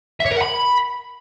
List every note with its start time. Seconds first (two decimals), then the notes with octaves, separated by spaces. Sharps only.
0.20 E5
0.26 C#5
0.31 A#4
0.36 F#5
0.42 B5